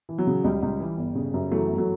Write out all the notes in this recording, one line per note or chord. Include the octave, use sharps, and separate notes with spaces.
E3
F#3
C#3
C#2 G3
C#2
E3
G1
C#3
F#2
E3 F#3 A3
G1
F#3 A3